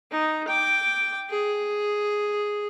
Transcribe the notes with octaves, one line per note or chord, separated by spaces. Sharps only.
D#4
G5 D6
G#4